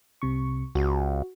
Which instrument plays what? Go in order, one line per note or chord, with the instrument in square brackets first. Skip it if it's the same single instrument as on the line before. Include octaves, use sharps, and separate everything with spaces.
[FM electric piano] C2 C3 C#6
[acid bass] C#2 [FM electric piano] F#4